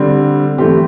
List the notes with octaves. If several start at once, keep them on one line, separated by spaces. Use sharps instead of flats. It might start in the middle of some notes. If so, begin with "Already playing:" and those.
Already playing: D3 G3 C4
E3 A3 C4 G4